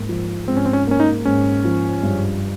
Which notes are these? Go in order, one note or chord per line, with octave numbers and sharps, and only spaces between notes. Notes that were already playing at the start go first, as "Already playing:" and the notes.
Already playing: G#2 A#3
F3
G#2 C4
C#4
C4
C#4
A#3 C#4
D#4
G#2 C#4
F3
G2